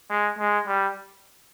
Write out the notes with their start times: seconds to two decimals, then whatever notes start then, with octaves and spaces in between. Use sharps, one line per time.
0.10 G#3
0.39 G#3
0.67 G3